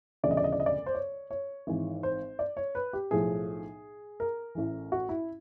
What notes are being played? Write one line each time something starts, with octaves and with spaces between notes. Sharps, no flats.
E1 D2 C#3 F3 D5
D#5
D5
D#5
D5
D#5
D5
C5
C#5
C#5
G#1 G#2 E3
C5
D5
C#5
B4
G4
B1 A2 F3 G#4
A#4
A1 A2 E3
F#4
E4